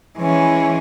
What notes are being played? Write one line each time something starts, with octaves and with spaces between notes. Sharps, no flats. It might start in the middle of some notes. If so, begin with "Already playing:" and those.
E3 G#3 C#4